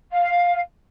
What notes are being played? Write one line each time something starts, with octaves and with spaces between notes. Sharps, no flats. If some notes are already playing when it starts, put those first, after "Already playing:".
F5